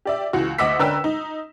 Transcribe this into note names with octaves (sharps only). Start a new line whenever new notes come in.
G4 D5 E5
C#2 E3 F#4
D2 D#5 F#5 D6 E6 B6
D3 C#4 A#4 B4 G5 E6
D#4